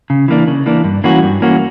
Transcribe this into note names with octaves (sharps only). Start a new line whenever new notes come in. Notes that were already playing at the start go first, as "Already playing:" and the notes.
C#3
E3 A#3 D4
C#3
E3 A#3 D4
G2
E3 A#3 C#4 F#4
G2
E3 A#3 C#4 F#4